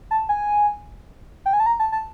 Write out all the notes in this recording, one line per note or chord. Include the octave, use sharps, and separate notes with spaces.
A5
G#5
G5
G#5
A5
A#5
A5
A5